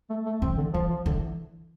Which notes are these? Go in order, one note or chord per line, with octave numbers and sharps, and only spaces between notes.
A3
A3
E3 C4
D3
E3 F3
F3
D3 E3